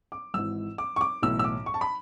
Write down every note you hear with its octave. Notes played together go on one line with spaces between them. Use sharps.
D6
G#1 G#2 E3 E6
D6
C#6
D6
B1 A2 E3 E6
E6
D6
C#6
A5
B5